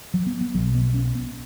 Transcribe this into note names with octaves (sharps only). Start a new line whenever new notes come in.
F#3
B3
B3
B1 B2 F#3
B3
C#4
B3